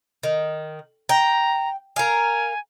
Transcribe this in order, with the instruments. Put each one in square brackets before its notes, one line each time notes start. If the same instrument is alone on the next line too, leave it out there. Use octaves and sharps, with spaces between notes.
[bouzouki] D#3
[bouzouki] G5 [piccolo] A#5
[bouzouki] A#4 F5 [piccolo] G#5